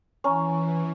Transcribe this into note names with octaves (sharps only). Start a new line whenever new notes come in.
E3 C#4 G#5 A#5 C#6